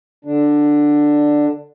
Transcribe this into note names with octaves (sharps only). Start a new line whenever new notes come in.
D3 D4